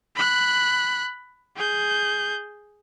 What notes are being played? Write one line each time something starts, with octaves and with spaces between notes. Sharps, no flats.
B5 F#6
G#4 G6